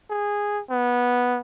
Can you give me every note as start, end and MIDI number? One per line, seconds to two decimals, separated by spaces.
0.10 0.61 68
0.70 1.40 59